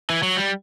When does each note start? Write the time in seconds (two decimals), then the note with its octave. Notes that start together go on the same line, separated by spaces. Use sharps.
0.10 E3
0.23 F#3
0.37 G3